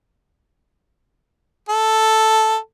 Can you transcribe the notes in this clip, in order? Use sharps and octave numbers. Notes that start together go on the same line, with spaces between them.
A4